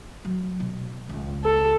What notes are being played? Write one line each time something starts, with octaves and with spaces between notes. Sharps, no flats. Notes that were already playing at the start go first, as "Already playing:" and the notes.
F#3
B2
C#2
A4